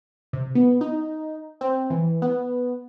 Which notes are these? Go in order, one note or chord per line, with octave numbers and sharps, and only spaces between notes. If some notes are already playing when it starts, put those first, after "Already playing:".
C3
B3
D#4
C4
E3
B3